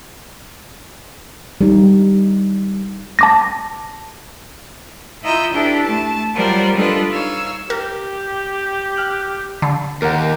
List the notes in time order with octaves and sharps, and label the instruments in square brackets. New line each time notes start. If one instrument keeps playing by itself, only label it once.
[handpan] G3 D#4
[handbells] A5 D6 A#6
[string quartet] E4 F4 D#5 A#5 E6 G6
D4 E4 G4 A4 B4
A3 A5
F#3 G3 F4 A#4 C5 D5
G3 D4 F4 A4 B4 D#5
D#4 C#5 F5 E6
[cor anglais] G4 [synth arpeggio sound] A#4
[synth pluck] G5 F6 F#6
[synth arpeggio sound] D3
[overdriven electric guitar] D#2 [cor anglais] G4 [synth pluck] A#4 F#5